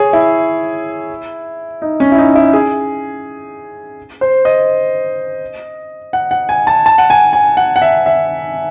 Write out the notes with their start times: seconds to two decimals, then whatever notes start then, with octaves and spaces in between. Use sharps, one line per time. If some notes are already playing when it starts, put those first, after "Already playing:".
Already playing: G#4 C#5
0.13 E4
1.82 D#4
2.00 C#4
2.12 E4
2.18 D#4
2.35 E4
2.53 G#4
4.21 C5
4.45 D#5
6.13 F#5
6.31 F#5
6.49 G#5
6.67 A5
6.86 A5
6.98 F#5
7.10 G#5
7.33 G#5
7.57 F#5
7.76 F#5
7.82 E5
8.06 E5